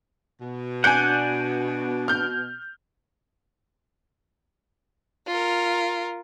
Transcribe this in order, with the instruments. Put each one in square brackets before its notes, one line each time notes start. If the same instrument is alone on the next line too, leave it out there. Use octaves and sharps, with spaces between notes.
[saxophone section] B2
[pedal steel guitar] D4 D5 F#5 [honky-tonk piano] G#5 G6
[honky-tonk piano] F6 G6
[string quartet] F4 A#4